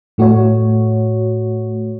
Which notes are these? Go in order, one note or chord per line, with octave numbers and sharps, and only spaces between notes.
A2 A3 F#4 C#5